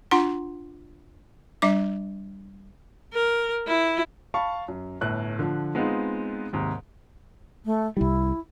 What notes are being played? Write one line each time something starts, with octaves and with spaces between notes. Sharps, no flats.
D4 F4 F#5 C6
G3 D4 E5 D6
A#4
E4
F5 A5 B5 C#6
F#2
G1 A2 F#6
D3 F3
G#3 B3 C4 D#4 F4
D#2 G#2 C3
A3
C2 G3 E4